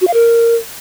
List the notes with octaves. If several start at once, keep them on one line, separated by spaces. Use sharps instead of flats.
F#4
F5
A#4